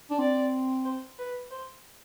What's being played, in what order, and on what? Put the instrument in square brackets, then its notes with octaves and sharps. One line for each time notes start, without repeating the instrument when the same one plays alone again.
[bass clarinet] D4
[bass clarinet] C4 [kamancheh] D5
[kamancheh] C5
B4
C5